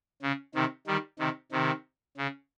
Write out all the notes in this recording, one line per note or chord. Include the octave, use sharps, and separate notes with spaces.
C#3
C3 D#3
D#3 G3
C3 D#3
C3 D#3
C#3